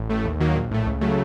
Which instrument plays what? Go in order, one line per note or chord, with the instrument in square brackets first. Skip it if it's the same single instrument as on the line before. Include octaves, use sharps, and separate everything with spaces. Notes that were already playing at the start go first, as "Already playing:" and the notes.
Already playing: [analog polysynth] A1
A2 A3
D#2
D#3 F#3 A#3
A#1
A2 A3
C#2
C#3 F#3 A3